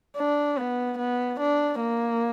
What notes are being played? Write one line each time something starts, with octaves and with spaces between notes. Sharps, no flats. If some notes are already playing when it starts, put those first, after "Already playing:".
D4
B3
B3
D4
A#3